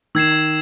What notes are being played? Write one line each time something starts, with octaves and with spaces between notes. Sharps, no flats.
D#3 E6 G#6 C7 E7